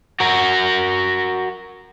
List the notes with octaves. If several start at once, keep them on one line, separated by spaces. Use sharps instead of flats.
F#4 A#4